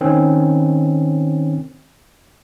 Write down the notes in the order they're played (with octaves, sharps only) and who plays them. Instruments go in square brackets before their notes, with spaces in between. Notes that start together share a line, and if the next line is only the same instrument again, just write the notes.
[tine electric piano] D#3 C4 C#4